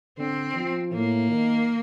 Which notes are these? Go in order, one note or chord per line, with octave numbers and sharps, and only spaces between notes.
D3 C4
F3
A2 A#3
D#3